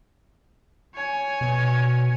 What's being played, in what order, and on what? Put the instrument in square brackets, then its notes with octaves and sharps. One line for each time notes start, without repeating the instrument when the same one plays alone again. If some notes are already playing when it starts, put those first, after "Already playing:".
[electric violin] C#5 G#5
[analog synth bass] B2